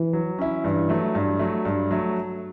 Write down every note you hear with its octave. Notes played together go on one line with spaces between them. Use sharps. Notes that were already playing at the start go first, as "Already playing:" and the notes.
Already playing: E3
F#3
C#4 E4
G2 E3
F#3 A3
G2
F#3 A3
G2
F#3 A3